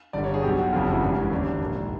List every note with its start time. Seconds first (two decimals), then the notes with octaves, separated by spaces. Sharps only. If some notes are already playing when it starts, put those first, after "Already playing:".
0.13 G1 G2 D3 D5
0.24 C#5
0.34 G#4
0.43 B1 B2 G4
0.58 F#4
0.73 F#1 F2 C#3 F4
0.83 F#4
0.92 E4
1.02 G#1 G2 E3 D4
1.16 C#4
1.30 D#2 D3 D4
1.60 A#1 G#2 D#3